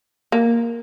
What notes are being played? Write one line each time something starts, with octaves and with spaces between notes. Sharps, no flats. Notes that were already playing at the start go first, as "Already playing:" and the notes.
A#3